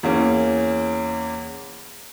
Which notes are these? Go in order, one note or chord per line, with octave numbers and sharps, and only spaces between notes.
E2 A#3 C#4